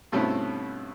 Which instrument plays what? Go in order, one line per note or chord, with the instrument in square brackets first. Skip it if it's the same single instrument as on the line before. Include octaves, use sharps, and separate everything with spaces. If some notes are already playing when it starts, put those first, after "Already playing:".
[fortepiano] G2 B2 A3 C4 C#4 E4